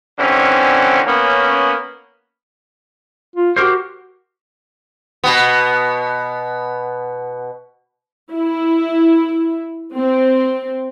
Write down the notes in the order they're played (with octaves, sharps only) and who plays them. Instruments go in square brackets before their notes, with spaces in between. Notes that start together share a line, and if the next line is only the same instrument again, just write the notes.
[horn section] D3 E3 G3 C4 C#4
A#3 B3 C#4
[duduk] F4
[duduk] F#4 [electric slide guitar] G4 A#4 C5
[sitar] B2 B3
[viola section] E4
C4